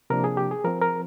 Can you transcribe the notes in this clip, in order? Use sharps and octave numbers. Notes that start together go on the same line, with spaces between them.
C3 F3 A#3 D4 A#4
G#4
G4
G#4
F3 C4 A#4
A#4